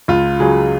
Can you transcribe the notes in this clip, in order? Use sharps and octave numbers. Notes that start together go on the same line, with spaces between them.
C#2 F4
C#3 F#3 G#4